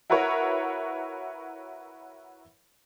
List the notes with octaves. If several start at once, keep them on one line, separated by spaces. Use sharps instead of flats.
E4 F#4 A#4 B4 C#5